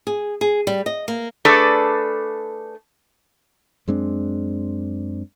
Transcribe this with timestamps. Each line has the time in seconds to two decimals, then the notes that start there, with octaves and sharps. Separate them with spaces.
0.07 G#4
0.41 G#4
0.67 G3
0.86 D#5
1.08 A#3
1.45 A3 D4 G#4 A4 B4 D5
3.88 F#2 G#3 C4 D4